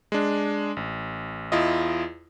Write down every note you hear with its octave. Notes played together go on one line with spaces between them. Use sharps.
G#3 D4
A1
E2 E4 F4 D#5